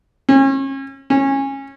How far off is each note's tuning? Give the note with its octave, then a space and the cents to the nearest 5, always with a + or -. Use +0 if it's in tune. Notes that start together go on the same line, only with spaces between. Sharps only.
C#4 -35
C#4 -20